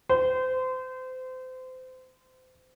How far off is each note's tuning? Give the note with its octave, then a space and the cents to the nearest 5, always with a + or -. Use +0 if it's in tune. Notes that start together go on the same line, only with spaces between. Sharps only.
C5 -30